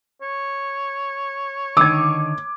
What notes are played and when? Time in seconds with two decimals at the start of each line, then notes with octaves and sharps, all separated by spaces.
0.22 C#5
1.77 D3 D#3 D#4 D6 E6 G#6